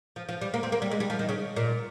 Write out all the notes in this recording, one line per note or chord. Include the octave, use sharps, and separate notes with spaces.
F3
F3
G3
A#3
C4
A#3
G3
G#3
G3
F3
D#3
C#3
A#2